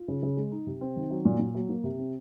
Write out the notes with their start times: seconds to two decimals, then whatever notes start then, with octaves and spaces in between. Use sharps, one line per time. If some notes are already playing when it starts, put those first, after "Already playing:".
Already playing: F4
0.08 C#3
0.23 C#3
0.37 G#3
0.51 D#4
0.67 C3
0.81 C4
0.96 D#3
1.10 F#3
1.25 A#2
1.40 A#2
1.55 F#3
1.69 A#3
1.84 C3
1.99 C4